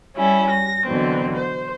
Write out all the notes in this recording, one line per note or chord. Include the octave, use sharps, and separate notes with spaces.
G3 C#4 E4
A#6
B2 D3 E3 F#3 C4
C5